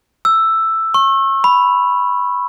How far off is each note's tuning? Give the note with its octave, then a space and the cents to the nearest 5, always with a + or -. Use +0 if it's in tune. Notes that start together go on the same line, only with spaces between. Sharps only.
E6 +5
C#6 -35
B5 +0